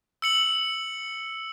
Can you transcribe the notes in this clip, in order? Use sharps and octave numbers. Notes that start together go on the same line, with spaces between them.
E6 C#7 F#7